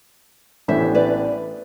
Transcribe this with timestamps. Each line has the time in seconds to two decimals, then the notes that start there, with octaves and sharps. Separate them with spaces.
0.68 A1 A2 E3 B3 D4 C5 E5
0.95 B4 D5